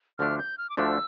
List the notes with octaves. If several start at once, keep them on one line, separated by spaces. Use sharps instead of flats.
D2 D3 F3 A3 D4 F6
G6
F6
D6
D2 D3 F3 A3 D4 E6